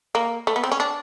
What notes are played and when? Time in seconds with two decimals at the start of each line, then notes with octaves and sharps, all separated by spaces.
0.15 A#3
0.47 A3
0.56 B3
0.64 C4
0.72 C#4
0.80 D4